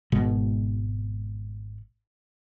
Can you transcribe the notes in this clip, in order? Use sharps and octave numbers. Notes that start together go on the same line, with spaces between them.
G#1 B2 G#3